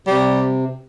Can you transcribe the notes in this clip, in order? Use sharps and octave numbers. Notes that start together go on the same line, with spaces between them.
C3 G3